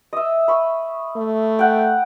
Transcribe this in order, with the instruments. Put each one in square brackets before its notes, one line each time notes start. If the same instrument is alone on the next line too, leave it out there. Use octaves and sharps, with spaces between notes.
[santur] D#5 E5
B5 C#6
[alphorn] A3
[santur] F#5 G5